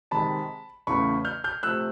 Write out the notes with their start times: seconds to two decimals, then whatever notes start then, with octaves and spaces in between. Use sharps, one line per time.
0.11 C3 D#3 G#3 A5 B5
0.87 E2 C#3 E3 A3 B5 C#6
1.25 F6 G6
1.44 F6 G6
1.63 C3 F3 A3 E6 F#6